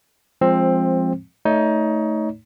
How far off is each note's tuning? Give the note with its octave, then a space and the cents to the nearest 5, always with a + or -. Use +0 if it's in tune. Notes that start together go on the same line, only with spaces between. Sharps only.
F3 +0 G#3 -5 C4 +15
A3 +5 D#4 +20 C#5 +30